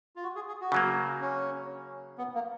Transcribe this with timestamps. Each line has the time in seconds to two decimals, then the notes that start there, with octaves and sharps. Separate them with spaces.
0.16 F4
0.23 F#4
0.36 G#4
0.48 G#4
0.61 F#4
0.72 C#3 F#3 A#3
1.21 C#4
2.18 B3
2.35 A#3